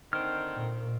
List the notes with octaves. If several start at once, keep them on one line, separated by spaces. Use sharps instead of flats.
D3 D#3 C4 F6
A#2